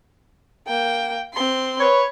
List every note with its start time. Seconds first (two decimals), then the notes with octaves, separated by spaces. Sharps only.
0.67 A#3 G5
1.34 C4 C6
1.80 B4 C#5